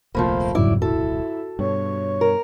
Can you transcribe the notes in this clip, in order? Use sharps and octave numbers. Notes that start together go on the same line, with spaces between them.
D#1 C2 F3 A3 A#3 C5 B5
F2 G#2 C#3 F#3 E4 D5
E4 F#4 A4
G2 B2 C#5
A#4